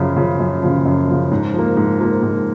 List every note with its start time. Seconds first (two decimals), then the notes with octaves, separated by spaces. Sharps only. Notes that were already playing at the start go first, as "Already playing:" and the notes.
Already playing: F#2 C#3 F3
0.16 C#3 F3
0.40 F#2
0.62 C#3 F3
0.85 F#2
1.08 C#3 F3
1.31 G#2
1.54 F3
1.59 A#3
1.77 G#2
2.00 F3 A#3
2.23 G#2